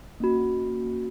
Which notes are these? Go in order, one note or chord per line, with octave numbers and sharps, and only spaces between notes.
A#3 C#4 F#4